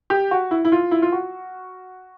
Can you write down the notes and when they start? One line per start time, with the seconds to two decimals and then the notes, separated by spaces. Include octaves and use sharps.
0.10 G4
0.31 F#4
0.51 E4
0.65 E4
0.72 F4
0.91 E4
1.02 F4
1.12 F#4